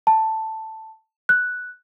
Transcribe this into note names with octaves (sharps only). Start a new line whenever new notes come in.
A5
F#6